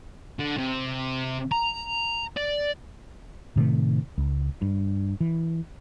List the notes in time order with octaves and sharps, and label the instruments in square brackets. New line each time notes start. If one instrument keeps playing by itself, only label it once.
[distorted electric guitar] D3
C3
A#5
D5
[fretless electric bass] A2 C3 D#3 A3
C#2
G2
E3